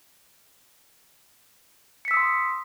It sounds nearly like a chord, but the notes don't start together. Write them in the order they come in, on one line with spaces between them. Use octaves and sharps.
C#7 B6 E6 D#6 C6